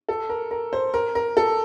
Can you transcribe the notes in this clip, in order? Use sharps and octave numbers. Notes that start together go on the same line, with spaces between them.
A4
A#4
A#4
C5
A#4
A#4
A4